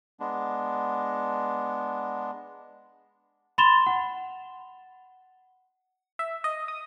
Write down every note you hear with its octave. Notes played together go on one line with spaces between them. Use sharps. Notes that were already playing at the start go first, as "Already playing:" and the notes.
G#3 B3 D4
B5 C6 A6 E7 F7 G7
F#5
E5
D#5
D#6